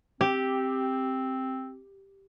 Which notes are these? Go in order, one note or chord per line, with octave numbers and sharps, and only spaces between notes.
C4 G4